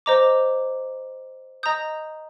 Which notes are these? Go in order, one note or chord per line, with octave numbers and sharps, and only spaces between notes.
C5 D#5 A#5 D6
D#5 A#5 D#6 G6